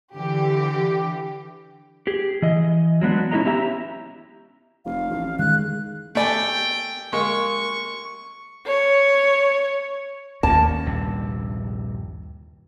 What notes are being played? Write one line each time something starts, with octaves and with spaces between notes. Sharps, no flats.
D3 E3 G4
G4 G#4
E3 D#5
F#3 G#3 B3 D4
C#4 E4 F#4 G#4 D#5 A#5
B3 C#4 G4 E5 G#5 A#5
F1 F5
A1
D#3 G#3 F#6
A3 D5 G5 G#5
G#3 A#3 C#6
C#5
D#2 A#3 C#4 A5
A#1 G2 C3